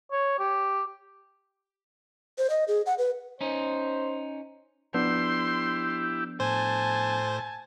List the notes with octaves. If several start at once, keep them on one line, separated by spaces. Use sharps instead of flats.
C#5
G4
C5
D#5
G#4
F#5
B4
C#4 D#4 C5
F3 B3 D4 E4 G4 C6
A2 C5 G#5 A5